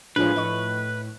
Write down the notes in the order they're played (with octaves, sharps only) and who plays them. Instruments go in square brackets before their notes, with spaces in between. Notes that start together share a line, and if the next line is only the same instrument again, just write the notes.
[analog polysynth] A2 F3 G#3 [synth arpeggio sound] D4 F4 C#5 [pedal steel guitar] B4
[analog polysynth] A2 [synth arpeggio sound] F3 D#5 C#6